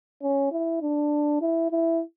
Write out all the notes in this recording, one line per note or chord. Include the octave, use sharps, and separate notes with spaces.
C#4
E4
D4
E4
E4